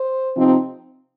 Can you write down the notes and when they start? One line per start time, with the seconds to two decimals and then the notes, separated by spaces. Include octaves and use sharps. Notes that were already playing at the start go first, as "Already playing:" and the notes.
Already playing: C5
0.37 C3 F3 C4 D#4